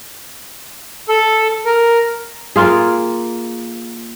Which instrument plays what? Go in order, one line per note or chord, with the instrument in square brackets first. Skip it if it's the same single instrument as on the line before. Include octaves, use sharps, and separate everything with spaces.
[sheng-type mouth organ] A4
A#4
[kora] A#3 F4 G#4